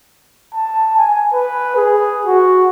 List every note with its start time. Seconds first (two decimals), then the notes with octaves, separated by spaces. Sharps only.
0.55 A5
0.98 G#5
1.33 B4
1.76 G#4
2.26 F#4